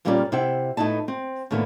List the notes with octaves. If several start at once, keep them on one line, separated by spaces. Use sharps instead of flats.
F2 A#2 G3 C#4 A#4 D5
C3 E4 C5 E5 F#5 G5
A2 B3 D#4 E4 A5
C4
A2 D3 D#3 A#3 B3